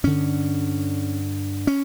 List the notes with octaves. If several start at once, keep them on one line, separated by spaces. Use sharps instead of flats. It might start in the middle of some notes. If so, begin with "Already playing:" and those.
G2 D3 C#4
C#4